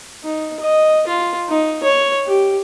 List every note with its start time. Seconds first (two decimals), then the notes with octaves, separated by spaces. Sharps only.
0.24 D#4
0.60 D#5
1.07 F4
1.49 D#4
1.83 C#5
2.26 G4